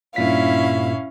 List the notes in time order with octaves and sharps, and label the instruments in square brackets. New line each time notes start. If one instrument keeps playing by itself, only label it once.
[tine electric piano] G2 A#2 B6 [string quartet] C#4 E4 F5